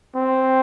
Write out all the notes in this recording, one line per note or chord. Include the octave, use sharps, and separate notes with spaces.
C4